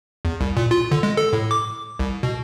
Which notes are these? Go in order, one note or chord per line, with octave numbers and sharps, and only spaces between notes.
E2
C2
A#2
F4
D3
G#3
A4
A2
D6
C2
B2